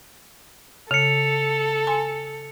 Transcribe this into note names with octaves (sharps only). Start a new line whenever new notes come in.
C#3 A4 C#7 F7
G#5 C6